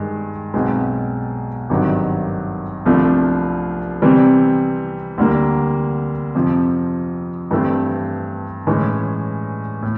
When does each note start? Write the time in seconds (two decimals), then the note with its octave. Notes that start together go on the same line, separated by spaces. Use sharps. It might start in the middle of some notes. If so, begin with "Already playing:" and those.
Already playing: G2 D#3 G#3
0.54 B1 B2 G#3 C4
1.69 G#1 G2 D#3 F#3
2.85 C2 C3 F3 A3 D4
4.02 C3 E3 G3 C4
5.18 D2 D3 G3 A#3
6.35 F2 C3 F3
7.51 G2 E3 A3 C4
8.67 A2 E3 G#3 C#4
9.83 A2